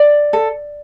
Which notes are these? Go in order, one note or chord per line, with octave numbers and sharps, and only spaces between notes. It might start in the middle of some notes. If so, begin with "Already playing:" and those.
Already playing: D5
A4